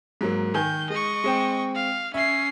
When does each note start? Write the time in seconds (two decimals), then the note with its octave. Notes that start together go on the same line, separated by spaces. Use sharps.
0.21 G#2 F#3 A#3
0.55 D#3 G#5 G6
0.90 G#3 D#5 C#6
1.24 G#3 C4 G5
1.75 F5
2.14 C#4 E5 C7